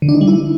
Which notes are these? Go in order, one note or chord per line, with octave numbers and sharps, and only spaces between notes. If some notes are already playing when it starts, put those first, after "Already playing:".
D3
D4
D#4
G3
E4